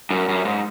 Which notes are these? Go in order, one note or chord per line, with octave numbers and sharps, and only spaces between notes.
F#2
F#2
G#2